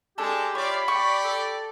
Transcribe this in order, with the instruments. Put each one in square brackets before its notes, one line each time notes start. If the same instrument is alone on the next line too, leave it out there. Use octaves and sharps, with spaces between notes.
[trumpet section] G#3 [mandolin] D4 A4 [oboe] G4
[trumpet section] E4 F4 D5 [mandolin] C#5 [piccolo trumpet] B5
[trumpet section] G4 D5 [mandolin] C#6
[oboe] A4